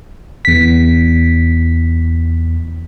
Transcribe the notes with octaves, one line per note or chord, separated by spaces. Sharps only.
E2 B6